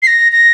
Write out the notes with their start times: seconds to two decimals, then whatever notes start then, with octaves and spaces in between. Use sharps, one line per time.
0.02 C7
0.07 A#6
0.32 A#6